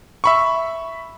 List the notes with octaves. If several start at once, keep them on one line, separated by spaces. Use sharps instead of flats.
E5 B5 C#6